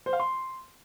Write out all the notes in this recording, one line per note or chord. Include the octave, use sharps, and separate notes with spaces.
C5
F5
C6